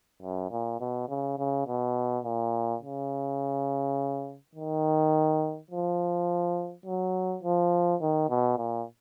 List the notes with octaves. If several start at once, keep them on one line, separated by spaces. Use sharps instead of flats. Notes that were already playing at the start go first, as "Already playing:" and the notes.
F#2
A#2
B2
C#3
C#3
B2
A#2
C#3
D#3
F3
F#3
F3
D#3
B2
A#2